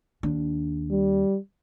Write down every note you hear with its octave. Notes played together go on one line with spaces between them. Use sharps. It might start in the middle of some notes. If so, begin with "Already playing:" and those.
D#2 D4
G3